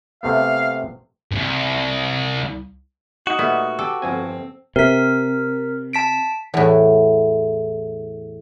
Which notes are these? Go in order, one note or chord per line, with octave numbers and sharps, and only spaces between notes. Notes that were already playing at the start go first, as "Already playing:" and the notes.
C3 A3 B3 F5
C2 G2
D#4 F#4
A#2 G3 A3 B3
G4 A4
G1 F2 C4 G#5
C3 A#4 B6
A5 B6 D7
E2 A2